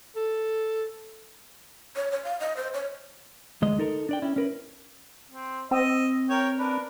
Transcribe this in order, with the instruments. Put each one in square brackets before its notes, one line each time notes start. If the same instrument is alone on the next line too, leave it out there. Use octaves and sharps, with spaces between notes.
[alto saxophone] A4
[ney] C#5
C#5
F5
D#5
C5
C#5
[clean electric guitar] D2 G#3 D#5
D#4 A4 A#4
D4 D5 G5
C#4 E4
C#4 A#4 B4
[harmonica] C4
[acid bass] C4 [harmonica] D#5 E6
[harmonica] A#4 C#5 G5
D4 A#4 B4